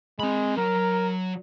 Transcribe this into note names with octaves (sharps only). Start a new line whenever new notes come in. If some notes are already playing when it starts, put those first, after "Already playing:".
G#3 C4 B5
F#3 A#4